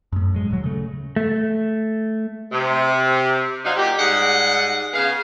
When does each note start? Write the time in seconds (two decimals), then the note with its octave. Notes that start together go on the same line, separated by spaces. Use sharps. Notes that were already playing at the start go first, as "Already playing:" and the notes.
0.12 F#2 A2
0.34 F#3 G#3
0.50 D#1 F#3
0.64 C#3 A3
1.16 A3
2.52 C3
3.64 F#3 D4 D#4 C5 F5
3.77 A#2 D#4 G4
3.98 G#2 G3 G#4 D#5 F#5
4.93 C#3 B3 G#4 F5